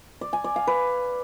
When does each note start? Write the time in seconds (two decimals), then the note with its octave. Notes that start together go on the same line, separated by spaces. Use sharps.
0.21 D5
0.33 G#5
0.44 D5
0.56 F5
0.67 B4